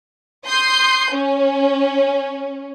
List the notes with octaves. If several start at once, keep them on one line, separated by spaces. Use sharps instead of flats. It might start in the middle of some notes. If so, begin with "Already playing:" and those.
C6 D#6 G6 C7
C#4